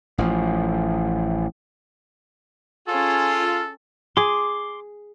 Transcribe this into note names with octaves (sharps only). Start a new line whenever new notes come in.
A1 F3
C#4 F4 G#4 A4
G#4 C6 D6